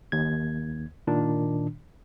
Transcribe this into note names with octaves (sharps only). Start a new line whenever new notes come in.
D#2 G#6
A#2 D#3 D4